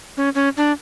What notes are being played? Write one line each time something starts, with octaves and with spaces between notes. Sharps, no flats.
C#4
C#4
D4